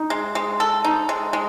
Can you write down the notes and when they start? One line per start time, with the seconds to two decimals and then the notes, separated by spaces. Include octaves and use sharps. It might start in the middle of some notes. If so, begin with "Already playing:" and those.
Already playing: D#4
0.10 G#3
0.35 G#3
0.60 A4
0.84 D#4
1.09 G#3
1.33 G#3